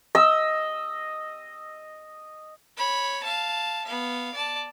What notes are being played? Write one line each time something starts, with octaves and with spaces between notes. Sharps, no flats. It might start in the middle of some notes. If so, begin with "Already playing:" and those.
D#5 E6
C#5 B5
F5 A5
B3 F5
D5 A5